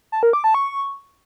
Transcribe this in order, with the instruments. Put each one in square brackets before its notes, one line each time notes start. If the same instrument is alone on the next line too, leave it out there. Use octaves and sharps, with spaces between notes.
[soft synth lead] A5
A#4
D6
A5
C#6